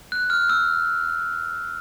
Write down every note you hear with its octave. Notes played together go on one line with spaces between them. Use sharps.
F#6
F6
E6